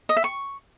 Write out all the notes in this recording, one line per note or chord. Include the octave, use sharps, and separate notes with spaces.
D#5
E5
C#6